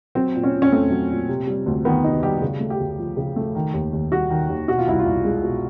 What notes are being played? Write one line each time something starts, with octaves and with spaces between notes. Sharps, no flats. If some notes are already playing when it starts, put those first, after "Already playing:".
F#3 C4
A#2
C#4
A#2
C#4
A3 C4
F#3
A#2
C3
G3
D2
D#3 B3
C3 D#4
G3 G4
C#3
A3
G4
D2
F3
C#3
A3
D#3
D#2
D#2
G3 F#4
D#3
D#2
B2 F#4
F4
C2 E4
F4
C2
G#3
B2